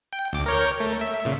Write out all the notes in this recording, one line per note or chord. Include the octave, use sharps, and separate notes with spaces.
G5
D2 D6
A#4 C#5 G6
A3
E5
A#2 C#3